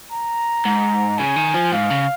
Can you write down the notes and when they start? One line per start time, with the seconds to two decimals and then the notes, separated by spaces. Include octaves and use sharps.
0.12 A#5
0.65 G#2
1.18 C#3 G#5
1.36 D#3
1.54 F3
1.72 G#2 F5
1.90 C#3